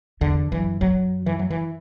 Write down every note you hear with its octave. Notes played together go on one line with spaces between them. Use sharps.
E2 D3
F#2 E3
F#2 F#3
E3
F#3
E3